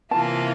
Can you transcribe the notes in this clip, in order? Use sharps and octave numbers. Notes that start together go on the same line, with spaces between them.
C3 E3 A#3 F4 A5